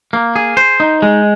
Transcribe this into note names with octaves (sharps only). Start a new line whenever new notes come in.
A#3
G#4
C5
D#4
G#3